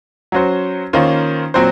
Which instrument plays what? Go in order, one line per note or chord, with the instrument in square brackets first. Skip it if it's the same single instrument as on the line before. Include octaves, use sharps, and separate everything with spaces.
[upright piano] F#3 C#4 F#4 C5
D#3 A#3 C#4 F4 C5
A#2 F#3 C4 F#4 C5